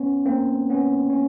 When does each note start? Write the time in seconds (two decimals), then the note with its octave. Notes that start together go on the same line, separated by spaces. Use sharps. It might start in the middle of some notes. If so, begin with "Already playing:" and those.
Already playing: B3 C#4
0.25 A#3 C4
0.70 B3 C#4
1.10 C#4